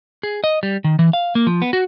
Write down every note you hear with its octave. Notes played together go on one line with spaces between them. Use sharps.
G#4
D#5
G3
D#3
E3
F5
A#3
F3
B3
F#4